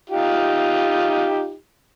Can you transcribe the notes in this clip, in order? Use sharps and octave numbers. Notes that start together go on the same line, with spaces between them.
D#4 F4 G4